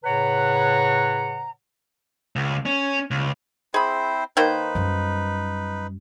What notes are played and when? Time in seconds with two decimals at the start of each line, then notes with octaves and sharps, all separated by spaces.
0.04 A2 C#3 B4 C#5 F#5 A#5
2.36 C#2
2.66 C#4
3.11 C#2
3.74 C4 E4 G#4 C5 B5
4.37 D#3 A#3 D#4 B4 C5
4.75 F#2 G3